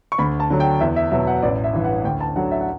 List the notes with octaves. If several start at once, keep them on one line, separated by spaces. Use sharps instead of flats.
C#6
D2 B5
A5
D3 F#3
G5
E2 E5
E5
B2 F#3 E5
F#5
A1 D5
E5
G2 E3
F#5
D2 G5
A5
D3 F#3 F#5
E5
F#5